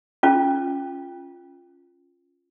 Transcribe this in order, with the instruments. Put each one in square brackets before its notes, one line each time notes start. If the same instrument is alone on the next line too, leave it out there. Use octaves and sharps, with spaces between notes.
[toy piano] C#4 F4